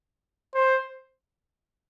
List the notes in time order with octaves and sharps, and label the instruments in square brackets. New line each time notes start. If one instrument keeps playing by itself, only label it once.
[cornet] C5